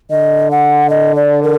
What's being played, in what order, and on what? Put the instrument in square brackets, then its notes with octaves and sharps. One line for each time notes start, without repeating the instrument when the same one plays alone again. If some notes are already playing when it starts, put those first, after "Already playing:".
[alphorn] D3 [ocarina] D#5
[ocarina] F#5
D#5
D5
A#4